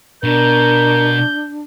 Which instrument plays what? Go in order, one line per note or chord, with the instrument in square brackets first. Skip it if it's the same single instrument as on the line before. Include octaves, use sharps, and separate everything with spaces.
[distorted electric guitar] B2 [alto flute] D4 [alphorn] A#4 [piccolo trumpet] G6